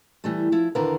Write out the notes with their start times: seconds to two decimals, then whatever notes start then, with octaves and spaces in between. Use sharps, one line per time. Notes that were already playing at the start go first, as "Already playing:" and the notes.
0.24 E3 G3 A3
0.52 F3 E4
0.75 E2 D3 D#3 A#4 B4 F5